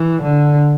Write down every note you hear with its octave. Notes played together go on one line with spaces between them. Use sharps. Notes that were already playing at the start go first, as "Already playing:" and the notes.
Already playing: E3
D3